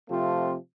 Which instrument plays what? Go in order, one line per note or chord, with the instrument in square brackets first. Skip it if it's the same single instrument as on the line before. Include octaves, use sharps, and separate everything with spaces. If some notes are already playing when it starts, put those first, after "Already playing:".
[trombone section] C3 F3 A3 C4 F4